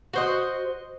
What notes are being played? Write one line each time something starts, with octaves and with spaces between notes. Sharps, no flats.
F#4 C5 D#5